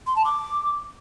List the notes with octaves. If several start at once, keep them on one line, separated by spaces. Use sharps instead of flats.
C6
A5
D6